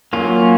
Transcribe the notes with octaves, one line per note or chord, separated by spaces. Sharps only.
F#3 A#3 C#4 F4